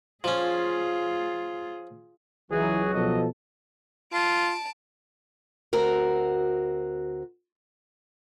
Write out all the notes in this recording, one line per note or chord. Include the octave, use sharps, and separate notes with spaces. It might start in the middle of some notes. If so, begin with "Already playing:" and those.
F3 C#4 F4 G#4
C#2 E3 F#3 F#4 G#4
B2 F3 A4 D#5
F4 A5 D7
D2 C4 F#4 A#4